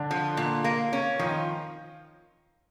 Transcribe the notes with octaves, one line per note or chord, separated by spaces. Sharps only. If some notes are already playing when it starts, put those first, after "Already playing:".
Already playing: D3 D4
F3
A#2
A#3
C#4
D#3 F3 D#4